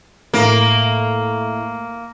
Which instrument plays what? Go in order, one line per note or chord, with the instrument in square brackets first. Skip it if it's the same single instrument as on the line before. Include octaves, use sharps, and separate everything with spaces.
[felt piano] A2 [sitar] A#3